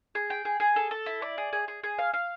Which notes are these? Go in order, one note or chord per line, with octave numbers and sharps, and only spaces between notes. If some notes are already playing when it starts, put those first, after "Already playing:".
G#4
G5
G#4
G#4
A4
A4
E4
D5
G#4
G#4
G#4
G#4
F5
F5